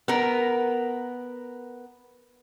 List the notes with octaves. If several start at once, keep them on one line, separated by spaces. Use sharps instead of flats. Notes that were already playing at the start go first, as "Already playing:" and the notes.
B3 A#4